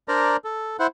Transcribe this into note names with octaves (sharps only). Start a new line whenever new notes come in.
D4 A#4 C5 D5 A#5
A4
E4 C5 F#5